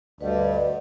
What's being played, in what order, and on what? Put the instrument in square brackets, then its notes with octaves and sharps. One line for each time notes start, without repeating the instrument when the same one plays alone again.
[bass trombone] D2 [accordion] G2 [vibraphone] B4 D#5 F#5 [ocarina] D5